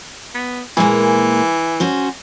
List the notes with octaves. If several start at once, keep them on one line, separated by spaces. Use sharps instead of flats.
B3
A#2 E3 G#3 A#3
C#4 F#4 C5